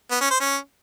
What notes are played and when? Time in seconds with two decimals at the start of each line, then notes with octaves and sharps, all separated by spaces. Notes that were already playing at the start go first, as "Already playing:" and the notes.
0.11 B3
0.21 C#4
0.30 C5
0.40 C#4